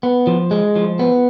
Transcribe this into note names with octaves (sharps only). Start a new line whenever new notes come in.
B3
F3
G#3
F3
B3